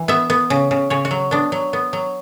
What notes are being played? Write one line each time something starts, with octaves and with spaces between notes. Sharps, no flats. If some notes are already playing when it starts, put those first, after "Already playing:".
Already playing: E3
B3 E5
B3
C#3
C#3
C#3 C#5
F#4
F#3
B3 D4
F#3
B3
F#3